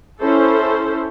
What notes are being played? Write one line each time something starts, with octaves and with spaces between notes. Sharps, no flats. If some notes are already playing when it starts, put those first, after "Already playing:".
C#4 E4 A4 C5